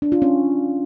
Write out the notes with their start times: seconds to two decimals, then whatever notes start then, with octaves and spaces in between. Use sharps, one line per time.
0.02 D4
0.12 F4
0.22 C#4